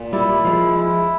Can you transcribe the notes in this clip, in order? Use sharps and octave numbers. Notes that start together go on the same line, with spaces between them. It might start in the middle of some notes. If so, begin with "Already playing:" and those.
Already playing: A#2
G3 E4
F3 G#3
E4